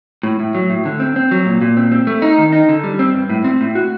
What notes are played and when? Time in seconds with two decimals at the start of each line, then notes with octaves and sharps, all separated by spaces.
0.23 A2
0.40 A2
0.55 F#3
0.70 A2
0.85 D3
1.00 C4
1.16 C4
1.31 F#3
1.46 A#2
1.61 A#2
1.77 C4
1.92 C4
2.07 A3
2.22 D#4
2.38 D#3
2.53 D#4
2.69 D3
2.84 G3
2.99 C4
3.14 G2
3.30 A2
3.44 C4
3.61 A2
3.75 F#4